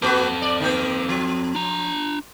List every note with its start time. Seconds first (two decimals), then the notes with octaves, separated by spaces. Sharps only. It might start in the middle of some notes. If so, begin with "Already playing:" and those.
0.02 A#3 C4 F#4 A4 B4
0.42 D5
0.60 D#3 A#3
1.09 F3
1.55 D4 A#5